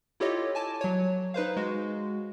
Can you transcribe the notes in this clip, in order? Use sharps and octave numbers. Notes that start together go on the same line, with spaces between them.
E4 F4 G4 A4 C#5 D#5
G#5 A5 D6
F#3 C#5
D#4 B4 C5 F5
G#3 F#4